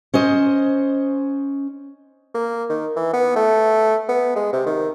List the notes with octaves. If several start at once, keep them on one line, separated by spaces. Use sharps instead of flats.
C#4 C5 D#5
A#3
D#3
E3
B3
A3
B3
G#3
C3
D#3